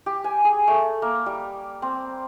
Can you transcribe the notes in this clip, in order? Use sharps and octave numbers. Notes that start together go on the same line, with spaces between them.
G4
G#5
G#4
A3
A#3
G3
C4